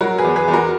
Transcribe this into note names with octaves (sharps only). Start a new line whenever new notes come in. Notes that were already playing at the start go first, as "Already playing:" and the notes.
F#3 F#4 A#4
G#4 B4
E2
G#4 B4
E2
F#4 A#4